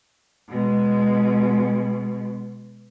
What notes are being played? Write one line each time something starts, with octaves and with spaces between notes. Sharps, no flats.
B2 G#3